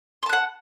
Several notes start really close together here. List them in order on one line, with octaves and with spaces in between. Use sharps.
C6 A5 F#6 F#5